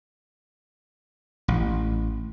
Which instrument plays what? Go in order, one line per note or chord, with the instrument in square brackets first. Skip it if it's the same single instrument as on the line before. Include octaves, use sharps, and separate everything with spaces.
[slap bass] A1